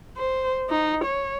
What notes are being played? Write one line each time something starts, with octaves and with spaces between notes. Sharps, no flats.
C5
D#4
C#5